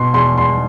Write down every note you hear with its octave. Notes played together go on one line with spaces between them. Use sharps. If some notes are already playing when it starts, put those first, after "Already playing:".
Already playing: B2 C6
E2 C6
E2 C6